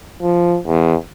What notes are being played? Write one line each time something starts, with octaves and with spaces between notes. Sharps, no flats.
F3
E2